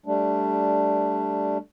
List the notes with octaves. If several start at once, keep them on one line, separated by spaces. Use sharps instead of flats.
G3 A3 D4